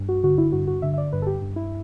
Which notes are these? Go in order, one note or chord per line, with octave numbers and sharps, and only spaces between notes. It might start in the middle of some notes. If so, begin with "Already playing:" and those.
Already playing: G2
F#4
D3 F#4
E4
G2 F#4
F#4
D3 E5
E5
D5
G2 B4
A4
G4
G2
E4